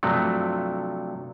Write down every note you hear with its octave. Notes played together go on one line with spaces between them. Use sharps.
G2 C3 F3 F#3 A3